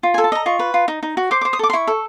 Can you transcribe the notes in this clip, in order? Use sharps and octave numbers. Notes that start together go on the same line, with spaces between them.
F4
G#5
A4
A5
D#5 A#5
F4 C#6
B4
F4
D#4
D#4
F#4
C5 D6
D6
C5
D#6
A4 D6
C6
E4 C#6
A4